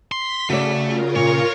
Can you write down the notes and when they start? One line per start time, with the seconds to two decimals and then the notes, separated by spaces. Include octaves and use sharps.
0.12 C6 B6
0.50 C#3 A3 F#4 D5
0.85 F4 A#4
1.16 A#2 C#5